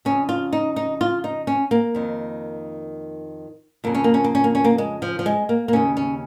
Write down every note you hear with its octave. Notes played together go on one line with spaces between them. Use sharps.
F2 C#3 C#4
F4
D#4
D#4
F4
D#4
C#4
A#3
F2 D#3
F2 C#3 A#3
C#4
A#3
C#4
A#3
C#4
A#3
C#4
A#3
G#3
F3
F3
G#3
A#3
A#3
D#2 C#3 C#4
C#4